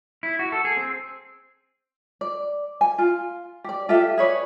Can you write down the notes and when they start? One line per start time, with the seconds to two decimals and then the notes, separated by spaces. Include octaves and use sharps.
0.23 E4
0.39 F#4
0.52 A4
0.65 G#4
0.77 C4
2.21 D5
2.81 G#5
2.98 F4
3.64 G4 D5
3.89 F4 G4 A4 E5
4.18 G#4 B4 C#5 D5